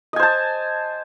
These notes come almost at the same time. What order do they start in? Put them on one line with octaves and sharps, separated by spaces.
D#5 G#5 C5 A5